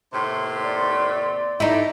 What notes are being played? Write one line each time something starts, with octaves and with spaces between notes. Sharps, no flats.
D#2 A2 C3 C6
D5
A3 D#4 E4 G4